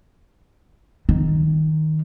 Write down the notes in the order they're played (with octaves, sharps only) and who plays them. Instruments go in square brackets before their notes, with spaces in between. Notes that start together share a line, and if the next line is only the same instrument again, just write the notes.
[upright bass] D#3